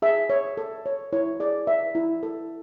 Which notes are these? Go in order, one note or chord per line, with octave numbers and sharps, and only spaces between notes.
G#4 E5
C#5
A4
C#5
E4 C#5
G#4 D5
B4 E5
E4
A4